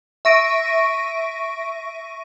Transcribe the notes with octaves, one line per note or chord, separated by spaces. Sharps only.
E5 C#6 A#6 D7 D#7